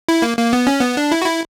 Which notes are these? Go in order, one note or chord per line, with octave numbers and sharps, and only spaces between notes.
E4
A#3
A#3
B3
C#4
B3
D4
E4
F#4
E4